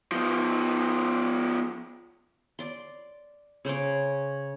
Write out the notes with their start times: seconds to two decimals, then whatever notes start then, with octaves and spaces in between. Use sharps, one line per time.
0.12 F3 B3
2.59 D5 C6
3.65 C#3 C5 C6 D6